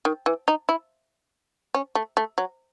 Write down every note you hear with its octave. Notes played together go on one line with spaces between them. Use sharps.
D#3
E3
D#4
E4
C#4
A3
A3
F#3